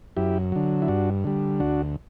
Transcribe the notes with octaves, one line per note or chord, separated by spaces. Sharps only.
F#2 E4 G4
D3 F#3
E4
G2 D4 F#4
D3 G3
D2 D4 F#4